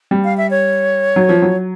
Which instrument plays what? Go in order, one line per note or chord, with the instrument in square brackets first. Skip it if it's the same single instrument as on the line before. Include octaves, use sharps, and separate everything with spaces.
[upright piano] G3
[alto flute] F5
E5
C#5
[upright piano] F#3
F3
F#3